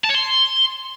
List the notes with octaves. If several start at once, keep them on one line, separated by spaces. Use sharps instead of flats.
A5
C#5
C6